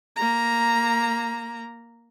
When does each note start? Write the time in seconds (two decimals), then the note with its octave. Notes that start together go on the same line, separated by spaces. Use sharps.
0.16 A#3 A#5